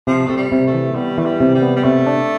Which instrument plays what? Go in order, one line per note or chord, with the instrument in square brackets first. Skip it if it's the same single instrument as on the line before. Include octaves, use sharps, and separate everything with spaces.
[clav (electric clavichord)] C3 [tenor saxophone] F3
[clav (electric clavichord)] C3 [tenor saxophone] A3
[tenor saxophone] G3
[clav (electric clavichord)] C3
[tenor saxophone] A3
[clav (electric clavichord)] E3
[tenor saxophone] G3 [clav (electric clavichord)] B3
[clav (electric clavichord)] E3 [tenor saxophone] A3
[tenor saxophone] G3
[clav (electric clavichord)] C3
[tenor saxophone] G3
[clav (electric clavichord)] B3
[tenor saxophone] G3
[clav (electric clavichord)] C3 [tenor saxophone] A3
[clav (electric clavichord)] D4